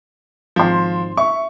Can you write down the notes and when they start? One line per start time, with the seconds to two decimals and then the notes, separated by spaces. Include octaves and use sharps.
0.56 G#1 F3 C6
1.17 E5 C#6